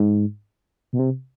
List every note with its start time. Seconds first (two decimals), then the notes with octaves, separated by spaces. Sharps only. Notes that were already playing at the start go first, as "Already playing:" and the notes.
Already playing: G#2
0.93 B2
0.99 C3